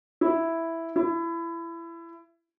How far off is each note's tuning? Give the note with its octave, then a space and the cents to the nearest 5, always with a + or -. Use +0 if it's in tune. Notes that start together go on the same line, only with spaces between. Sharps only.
E4 +0
E4 +25